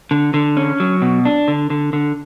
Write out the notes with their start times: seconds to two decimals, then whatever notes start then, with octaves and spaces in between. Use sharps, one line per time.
0.11 D3
0.34 D3
0.57 C#4
0.80 F#3
1.02 B2
1.25 D4
1.48 D3
1.70 D3
1.93 D3